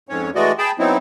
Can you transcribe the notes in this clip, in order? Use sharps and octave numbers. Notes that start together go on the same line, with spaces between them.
F2 G#2 C#4 C#5
E3 G#3 A3 F#4 D5 D#5
G#4 G5 A5 B5
F#3 B3 C4 D#4 E4